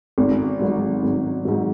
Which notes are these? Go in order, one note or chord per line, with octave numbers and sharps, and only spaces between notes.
G#1
G#2 F#3
G#1
G#2 F#3